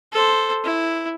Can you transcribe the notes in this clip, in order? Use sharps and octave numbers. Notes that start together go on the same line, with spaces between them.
A4 C5
E4